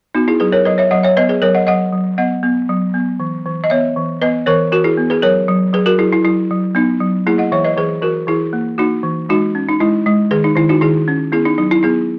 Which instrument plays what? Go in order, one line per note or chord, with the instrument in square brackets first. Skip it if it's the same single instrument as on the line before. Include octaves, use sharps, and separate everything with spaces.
[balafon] B3 D#4 F#4
E4 G#4
F#3 G#4 B4
A#4 C#5
F#3 B4 D#5
C#5 E5
F#3 D#5 F#5
C#5 E5
B3 B4 D#5
G#4 B4
F#3 A#4 C#5
D#5 F#5
F#3 D#5 F#5
F#3
B3 D#5 F#5
B3
F#3
B3
E3
E3
D#5
B3 C#5 E5
E3
B3 B4 D#5
E3 A#4 C#5
E3 F#4 A#4
E4 G#4
B3
G#4 B4
F#3 A#4 C#5
F#3
F#3 G#4 B4
F#4 A#4
F#3 E4 G#4
E4
F#3 E4
F#3
B3 D#4
F#3
A#3 E4 G#4
D#5 F#5
E3 C#5 E5
B4 D#5
E3 G#4 B4
E3 F#4 A#4
E3 E4 G#4
A#3
A#3 D#4 F#4
E3
G#3 D#4 F#4
C#4
D#4
G#3 E4
G#3
D#3 G#4 B4
D#4
D#3 E4
D#4 F#4
D#3 E4 G#4
C#4
B3 E4 G#4
D#4
F#3 D#4
E4
B3 E4 G#4